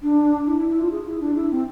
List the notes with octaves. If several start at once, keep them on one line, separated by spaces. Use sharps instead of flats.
D4
E4
E4
E4
F4
G#4
E4
D4
E4
C4